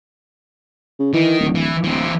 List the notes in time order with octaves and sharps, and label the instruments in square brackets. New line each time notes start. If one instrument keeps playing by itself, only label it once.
[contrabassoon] C#3
[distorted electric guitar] D#3 [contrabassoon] E3
[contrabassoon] D1
[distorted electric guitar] E3
[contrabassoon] D1 [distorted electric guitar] E3 C4